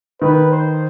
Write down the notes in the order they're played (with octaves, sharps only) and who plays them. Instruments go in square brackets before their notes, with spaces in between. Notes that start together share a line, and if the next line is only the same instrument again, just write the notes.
[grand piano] D#3 [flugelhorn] B4
[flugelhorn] C5